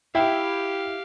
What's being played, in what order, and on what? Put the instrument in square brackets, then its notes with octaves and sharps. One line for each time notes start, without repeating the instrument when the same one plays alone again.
[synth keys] E4 [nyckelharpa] G4 F5 [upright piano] E5 G5